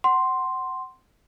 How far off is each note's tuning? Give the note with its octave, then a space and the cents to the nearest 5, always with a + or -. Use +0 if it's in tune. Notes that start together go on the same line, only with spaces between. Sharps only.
F#5 +20 C6 +0